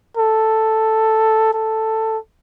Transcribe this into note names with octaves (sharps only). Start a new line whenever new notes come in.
A4
A4